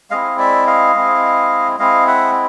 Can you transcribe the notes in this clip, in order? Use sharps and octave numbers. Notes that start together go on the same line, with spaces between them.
G#3 C4 E4 D#5 F5
D5 E5
D#5 F5
G#3 C4 E4
G#3 C4 E4 D#5 F5
E5 F#5